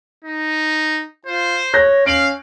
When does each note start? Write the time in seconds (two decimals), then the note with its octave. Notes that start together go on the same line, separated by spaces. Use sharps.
0.24 D#4
1.26 F4 C5
1.73 C#5 F#6 G6 A#6
2.06 C#4 F5 D7 F#7